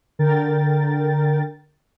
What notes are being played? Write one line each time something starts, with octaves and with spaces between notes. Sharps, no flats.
D3 A#4 G5 A6